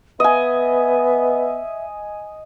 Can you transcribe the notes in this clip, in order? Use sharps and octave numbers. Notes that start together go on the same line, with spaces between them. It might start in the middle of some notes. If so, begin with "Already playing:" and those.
B3 D#5 E5 G#5